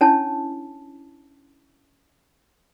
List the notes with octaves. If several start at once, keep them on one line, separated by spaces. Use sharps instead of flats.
C#4 D4 E4 C#5 G#5 A5